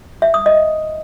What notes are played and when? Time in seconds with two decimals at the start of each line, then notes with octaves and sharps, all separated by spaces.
0.22 E5
0.34 D#6
0.46 D#5